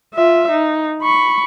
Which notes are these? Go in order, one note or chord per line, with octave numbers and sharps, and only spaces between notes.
F4 E5
D#4
B5 C#6